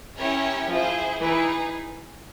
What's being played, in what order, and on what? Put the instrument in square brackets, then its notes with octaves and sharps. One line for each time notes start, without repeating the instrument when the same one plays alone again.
[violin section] C#4 E4 G4 A#4 C#5
[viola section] F3 [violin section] E4 G#4 C5
[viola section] E3 [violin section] D#4 G#4 B4